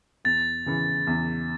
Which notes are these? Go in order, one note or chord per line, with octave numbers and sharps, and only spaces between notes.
E2 A6
C#3 E3
E2